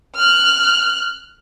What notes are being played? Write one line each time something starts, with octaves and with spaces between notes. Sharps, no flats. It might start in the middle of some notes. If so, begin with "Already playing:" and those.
F6 F#6